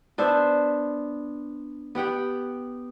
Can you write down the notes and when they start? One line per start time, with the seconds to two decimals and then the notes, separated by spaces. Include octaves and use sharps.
0.18 B3 D4 C5 E5
1.95 B3 G4 F#5 G5